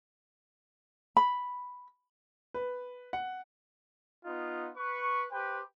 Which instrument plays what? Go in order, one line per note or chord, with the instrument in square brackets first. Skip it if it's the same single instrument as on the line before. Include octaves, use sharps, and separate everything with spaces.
[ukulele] B5
[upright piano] B4
F#5
[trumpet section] B3 D#4 F4
B4 C#6
G4 B4 C5 G5